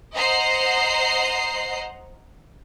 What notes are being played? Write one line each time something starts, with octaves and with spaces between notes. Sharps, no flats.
C5 D#5 F#5 A#5 C7